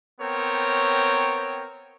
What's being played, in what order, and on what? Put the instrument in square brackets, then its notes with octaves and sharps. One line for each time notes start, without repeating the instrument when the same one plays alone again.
[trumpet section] B3 C4 A#4 C#5 G5